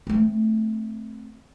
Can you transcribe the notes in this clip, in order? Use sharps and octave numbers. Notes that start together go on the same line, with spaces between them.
A3 C4